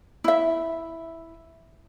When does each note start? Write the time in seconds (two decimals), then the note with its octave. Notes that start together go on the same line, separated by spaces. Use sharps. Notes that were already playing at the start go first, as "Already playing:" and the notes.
0.24 E4 E5